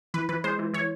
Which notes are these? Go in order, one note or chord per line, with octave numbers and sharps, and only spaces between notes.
E3 B4
E3 B4
G#3 C5
E3
E3 C#5